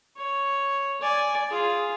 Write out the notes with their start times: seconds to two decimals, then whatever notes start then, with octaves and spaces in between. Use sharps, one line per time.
0.16 C#5
1.01 D5 G#5
1.51 F4 G#4